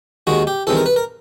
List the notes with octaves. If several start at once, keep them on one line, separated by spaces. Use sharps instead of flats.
D#2 D#3 G#3 F#4
G4
E2 C3 D#3 G#3 A4
A#4
B4
A#4